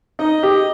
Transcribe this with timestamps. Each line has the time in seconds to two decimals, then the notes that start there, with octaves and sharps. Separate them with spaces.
0.19 D#4 D#5
0.43 G4